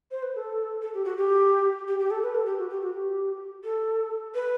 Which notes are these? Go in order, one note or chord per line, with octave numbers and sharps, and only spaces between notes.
C5
B4
A4
A4
G4
F#4
G4
G4
G4
A4
B4
A4
G4
F#4
G4
F#4
G4
A4
B4